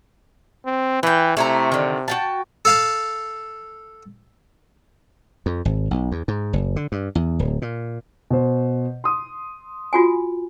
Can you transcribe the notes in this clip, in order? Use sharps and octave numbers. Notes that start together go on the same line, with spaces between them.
C4
E3 B4 G5
C3 A3 E4 A#5
D3 D#3
F#4 G5 A5
A4 F5 A5
F2
G#1
B1
E2
G#2
F#1
D3
G2
E2
D1
A#2
B2 C5
C6 D#6
F4 F#4 G#5